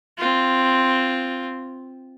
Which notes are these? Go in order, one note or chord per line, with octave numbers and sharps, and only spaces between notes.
C4 F4